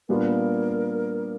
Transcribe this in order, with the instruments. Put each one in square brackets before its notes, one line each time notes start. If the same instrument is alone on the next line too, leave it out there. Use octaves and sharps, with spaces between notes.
[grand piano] A#2 G3 B3 D4 F4 [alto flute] A#4